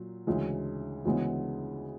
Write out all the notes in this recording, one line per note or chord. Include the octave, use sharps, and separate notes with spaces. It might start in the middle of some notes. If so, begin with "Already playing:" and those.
Already playing: A#2 F#3
D2 C#3 E3 G#3
D2 C#3 E3 G#3 B3